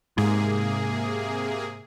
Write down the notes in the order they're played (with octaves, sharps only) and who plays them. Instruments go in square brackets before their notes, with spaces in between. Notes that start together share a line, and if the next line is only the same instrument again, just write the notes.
[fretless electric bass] G#2 [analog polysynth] C3 A#3 G#4